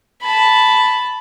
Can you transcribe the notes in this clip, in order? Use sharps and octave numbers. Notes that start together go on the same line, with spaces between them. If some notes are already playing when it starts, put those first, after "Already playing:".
A5 B5